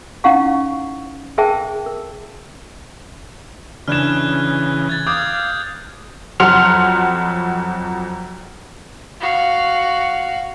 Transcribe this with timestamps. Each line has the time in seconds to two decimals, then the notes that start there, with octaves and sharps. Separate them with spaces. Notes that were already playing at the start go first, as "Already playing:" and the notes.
0.24 C#4 D#4 E4 F5 F#5 C#6
1.38 G#4 A#4 C5 E5 G5 A5
1.86 A#4
3.88 C#3 E3 D4 F6 F#6 G#6 E7
4.89 G#6 A6
5.07 F5 D6 D#6 G6 G#6
6.40 F2 F#3 F#5 C6 F6 F7
9.20 F#4 F5